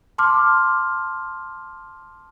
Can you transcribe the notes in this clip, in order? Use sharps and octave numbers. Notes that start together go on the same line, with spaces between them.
A5 C6 D6 F6